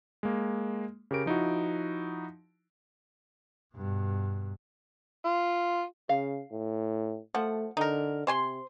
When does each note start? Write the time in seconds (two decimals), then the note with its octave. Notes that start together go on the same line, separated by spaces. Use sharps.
0.23 G#3 A#3
1.11 C#3 G4 A#4 D7
1.26 F3 D#4 E4 F#4
3.75 G2 B2
5.25 F4
6.09 C#3 F5
6.52 A2
7.35 F3 A3 F#5
7.77 D3 D#4 A#4
8.27 C3 C5 G#5 C6